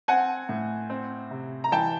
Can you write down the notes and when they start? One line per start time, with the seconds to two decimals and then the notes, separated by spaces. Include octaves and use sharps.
0.08 C4 F#5 G#5
0.49 A2
0.90 C4
1.31 C3
1.64 A#5
1.72 E3 G5 A5